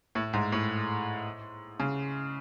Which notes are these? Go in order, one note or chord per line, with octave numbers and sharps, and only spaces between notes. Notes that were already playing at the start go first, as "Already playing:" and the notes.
A2
G#2
A2
C#3